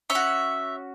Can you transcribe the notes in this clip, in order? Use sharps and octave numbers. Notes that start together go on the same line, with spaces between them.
C#4 C#5 E5
F#4